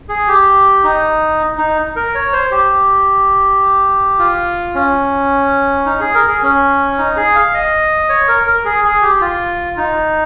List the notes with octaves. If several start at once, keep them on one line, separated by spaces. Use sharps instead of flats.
G#4
G4
D#4
D#4
A#4
C#5
C5
G4
F4
C#4
D#4
G#4
A#4
G#4
C#4
D#4
G#4
F5
D#5
C#5
A#4
A#4
G#4
G#4
G4
F4
D#4